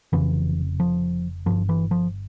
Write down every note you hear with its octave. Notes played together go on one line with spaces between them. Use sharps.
F1 F2 C#3 E3
F3
G1 G2 F3
E3
F3